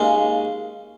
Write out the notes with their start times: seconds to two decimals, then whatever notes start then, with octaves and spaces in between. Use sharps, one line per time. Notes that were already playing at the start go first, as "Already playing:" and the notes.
Already playing: D#2 C#3 G#3